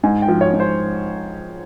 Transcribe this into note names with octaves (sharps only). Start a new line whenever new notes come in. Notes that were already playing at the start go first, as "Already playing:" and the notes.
G#2 G#5
G5
F3
C#5
G#2
C5